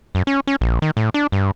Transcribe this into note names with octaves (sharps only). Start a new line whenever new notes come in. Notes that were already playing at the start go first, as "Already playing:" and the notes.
F#2
C#4
C#4
A#1
D#3
A2
D4
G2